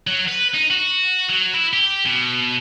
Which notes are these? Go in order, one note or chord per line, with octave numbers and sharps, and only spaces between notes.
F#3
B4
D#4
F#4
F#3
E4
G4
B2